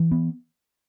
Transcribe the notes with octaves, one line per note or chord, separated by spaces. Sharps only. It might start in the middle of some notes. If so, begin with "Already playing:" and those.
Already playing: E3
B3